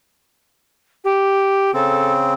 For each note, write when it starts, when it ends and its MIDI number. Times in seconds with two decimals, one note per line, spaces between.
1.04 1.73 67
1.74 2.34 49
1.74 2.34 60
1.74 2.13 69